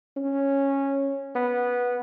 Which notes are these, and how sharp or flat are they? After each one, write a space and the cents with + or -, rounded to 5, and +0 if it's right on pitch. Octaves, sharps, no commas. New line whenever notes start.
C#4 -10
B3 -10